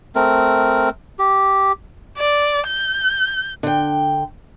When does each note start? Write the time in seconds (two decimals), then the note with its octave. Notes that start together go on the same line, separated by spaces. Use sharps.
0.15 A3 C4 A#4
1.19 G4
2.18 D5
2.67 G6
3.63 D3 G5